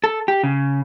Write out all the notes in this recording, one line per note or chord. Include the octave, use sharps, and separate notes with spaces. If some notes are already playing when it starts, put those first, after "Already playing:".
A4
G4
C#3